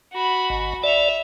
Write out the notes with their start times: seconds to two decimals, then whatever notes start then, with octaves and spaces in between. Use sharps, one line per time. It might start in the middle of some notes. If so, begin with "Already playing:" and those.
0.13 F#4 B5
0.50 G#1
0.84 D5 E5 F7